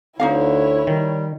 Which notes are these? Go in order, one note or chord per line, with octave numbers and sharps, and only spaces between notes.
D2 D3 D#4 E4 F#4 C#5 F5
D#3 G3